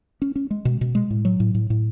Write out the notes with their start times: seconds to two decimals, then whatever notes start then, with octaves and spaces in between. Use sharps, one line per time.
0.22 C#4
0.36 C#4
0.51 G#3
0.65 B2
0.81 B2
0.95 G#3
1.10 A2
1.25 F#3
1.40 A2
1.55 A2
1.70 A2